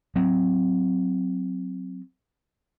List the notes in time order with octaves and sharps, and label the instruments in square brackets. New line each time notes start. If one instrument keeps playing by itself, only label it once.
[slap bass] F#3 C4